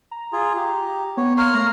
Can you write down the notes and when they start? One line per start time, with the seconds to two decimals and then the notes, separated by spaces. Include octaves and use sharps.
0.11 A#5
0.33 F4 G#4
0.56 G4
1.17 B3 C#5
1.37 A#3 C#5 C6 F6
1.54 A3 A#5